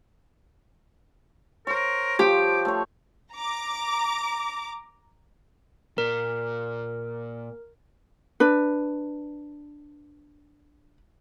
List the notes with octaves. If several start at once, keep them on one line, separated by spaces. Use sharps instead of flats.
A#4 C5 C#5
F3 G4 D6
A3 C#5
A#5 D6
A#2 A#4
D4 B4